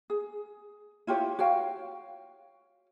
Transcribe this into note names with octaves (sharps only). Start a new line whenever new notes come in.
G#4
E4 F4 G4 C#5
F#4 C#5 F5 G5